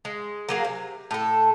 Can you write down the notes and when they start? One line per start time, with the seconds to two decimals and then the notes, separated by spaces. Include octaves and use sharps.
0.05 G#3
0.49 F#3 A#3 G#4
0.65 C3
1.11 A2 A4